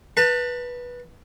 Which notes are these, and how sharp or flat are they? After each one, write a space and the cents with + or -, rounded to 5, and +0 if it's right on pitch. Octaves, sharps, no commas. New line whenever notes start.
B4 -15 A5 +30